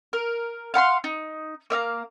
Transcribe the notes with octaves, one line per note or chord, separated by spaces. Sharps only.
A#4
F5 F#5 B5 C6
D#4
A#3 E5 F5 A#5